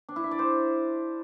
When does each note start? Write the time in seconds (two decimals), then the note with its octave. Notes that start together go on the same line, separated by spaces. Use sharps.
0.09 D4
0.16 E4
0.24 E5
0.31 D5
0.39 C5